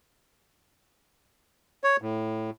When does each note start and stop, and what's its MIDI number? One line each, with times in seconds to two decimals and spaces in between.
1.84 1.97 73
2.02 2.50 45